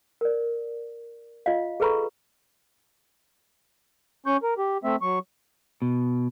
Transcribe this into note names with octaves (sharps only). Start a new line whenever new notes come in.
A#4 D5
F4 D#5 F5
G#4 A4 B4 A#5 B5 C#6
C#4 C#6 G6
A#4
G4
A3 C4 E5
F#3 C#6
B2